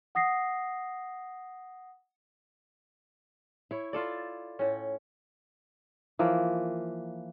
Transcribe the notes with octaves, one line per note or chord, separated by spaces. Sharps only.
F#5 D#6 A#6 C7
E4 C#5
E4 F4 A4 D5
A2 C#4
E3 F3 A#3